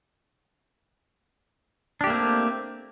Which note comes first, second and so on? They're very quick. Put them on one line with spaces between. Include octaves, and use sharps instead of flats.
D4 G4 A3 A#3 C4